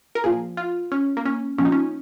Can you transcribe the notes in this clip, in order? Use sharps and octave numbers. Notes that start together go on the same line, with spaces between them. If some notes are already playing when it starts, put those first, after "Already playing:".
A#4
A#2 F3 G#4
F4
C#4
A#3
C#4
A#2 F3 C#4
D#4
C#4